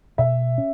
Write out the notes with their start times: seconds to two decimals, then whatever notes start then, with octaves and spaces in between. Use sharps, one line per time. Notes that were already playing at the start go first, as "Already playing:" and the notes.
0.18 B2 E5
0.58 C#4